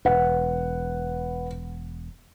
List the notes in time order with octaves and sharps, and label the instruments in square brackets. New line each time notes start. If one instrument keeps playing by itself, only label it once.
[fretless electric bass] E1 [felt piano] B4 F#5